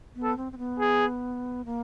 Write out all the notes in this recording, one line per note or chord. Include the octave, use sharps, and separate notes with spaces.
B3
A4
C4
C4
B3
G#4
A#3